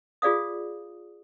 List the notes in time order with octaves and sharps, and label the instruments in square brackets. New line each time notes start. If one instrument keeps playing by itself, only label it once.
[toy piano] F4 G#4 D5 F5 D#6